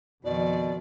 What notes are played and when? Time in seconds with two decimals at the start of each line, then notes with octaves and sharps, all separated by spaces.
0.25 F2 B2 D#3 F3 D5